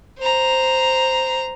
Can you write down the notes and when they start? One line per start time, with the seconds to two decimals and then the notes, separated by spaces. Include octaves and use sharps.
0.19 C5 A#5